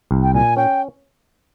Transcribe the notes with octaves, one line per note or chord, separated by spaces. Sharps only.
C2
G5
A#2 G#5
C#4 G5